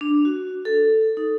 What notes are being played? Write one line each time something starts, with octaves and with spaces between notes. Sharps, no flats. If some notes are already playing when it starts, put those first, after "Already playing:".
D4
F#4
A4
D#4